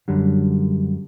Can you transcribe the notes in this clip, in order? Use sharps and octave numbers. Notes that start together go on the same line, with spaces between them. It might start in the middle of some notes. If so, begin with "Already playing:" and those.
F#2 D3 G3